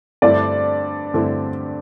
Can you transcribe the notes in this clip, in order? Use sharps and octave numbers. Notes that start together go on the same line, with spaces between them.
G2 D3 A3 C4 E4 D5
G2 D3 A3 C4 E4